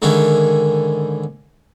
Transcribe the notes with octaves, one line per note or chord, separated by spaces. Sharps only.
G#2 D3 D#3 C#4 E4